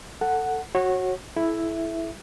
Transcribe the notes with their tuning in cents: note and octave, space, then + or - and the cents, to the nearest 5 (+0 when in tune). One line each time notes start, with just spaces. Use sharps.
A4 +20 F#5 +0
F#4 +0 C#5 -25
E4 +0 A4 -45 E5 +0